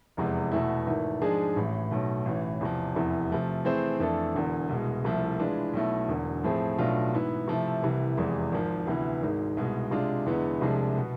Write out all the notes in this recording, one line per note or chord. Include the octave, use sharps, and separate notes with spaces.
F1 E2 C3 G#3
E2 B2 A3 E4
G#1 G#2 E3 A3
G#2 F3 G#3 D4 G#4
A1 A2 E3
B1 B2 A3
A1 A2 E3
E2 C3 F3
F1 E2 C3 E3
C3 F3 A3
E3 A3 C4 G#4 C5
F2 E3 A3 D4 A4
E1 E2 D3
C2 B2 G#3
C2 C3 F3 A3 E4
E3 G#3 D4 F4 B4
B1 B2 A3 E4
E1 E2 D3
A2 F3 A3 C4 G#4
B1 B2 A3 D4 F4
G#2 E3 B3 E4
C3 F3 A3 E4
C2 C3 E3
F1 E2 C3 E3 G#3
G#1 G#2 F3
D2 C3 E3 B3 E4
G#1 G#2 G#3
C2 B2 G#3
C3 G#3 D4 F4
E2 D3 G#3 B3 E4
C2 C3 F3 G#3 D4
B2 B3